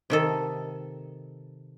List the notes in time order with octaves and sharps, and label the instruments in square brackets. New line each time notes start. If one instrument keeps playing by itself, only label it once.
[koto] C3 D#3 A4